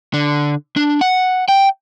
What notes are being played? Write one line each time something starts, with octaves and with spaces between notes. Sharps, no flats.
D3
D4
F#5
G5